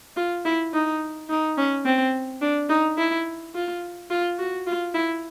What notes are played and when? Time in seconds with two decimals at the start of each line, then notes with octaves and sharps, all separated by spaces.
0.17 F4
0.45 E4
0.73 D#4
1.29 D#4
1.58 C#4
1.85 C4
2.42 D4
2.69 D#4
2.98 E4
3.55 F4
4.10 F4
4.39 F#4
4.67 F4
4.94 E4